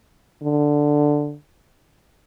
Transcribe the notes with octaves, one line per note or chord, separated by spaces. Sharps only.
D3